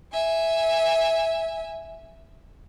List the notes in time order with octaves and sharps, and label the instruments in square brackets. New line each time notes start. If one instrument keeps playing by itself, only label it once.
[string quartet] E5 G#5